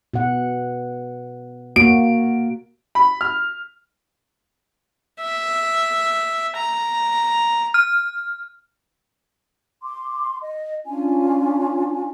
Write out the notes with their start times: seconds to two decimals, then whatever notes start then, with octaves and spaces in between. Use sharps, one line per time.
0.14 B2 F#5
1.76 A#3 F#4 D7
2.95 B5
3.21 F6
5.21 E5
6.57 A#5
7.74 F6
9.82 C6 D6
10.42 D#5
10.86 C#4 D4 F4 G#5